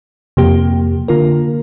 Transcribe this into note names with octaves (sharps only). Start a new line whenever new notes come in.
F2 C3 F3 A#3 G4
D3 A#3 F4 A#4